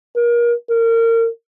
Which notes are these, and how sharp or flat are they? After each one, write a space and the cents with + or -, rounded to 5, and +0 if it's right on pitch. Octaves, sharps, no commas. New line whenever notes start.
A#4 +30
A#4 -30